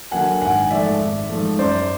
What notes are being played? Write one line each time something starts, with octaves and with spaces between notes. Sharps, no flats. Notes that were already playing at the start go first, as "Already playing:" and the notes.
D3 F#3 A#3 F#5 G#5
G#1 F#5 G#5
G#2 F3 A3 D5 E5
G#1
G#2 F3 A3
F#2 C5 D5